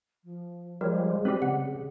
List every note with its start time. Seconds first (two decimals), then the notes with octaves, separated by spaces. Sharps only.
0.24 F3
0.81 F3 G3 G#3 A#4 C#5
1.25 F#3 G#3 C4 G4 B4 D5
1.42 C#3 F#5
1.64 G#4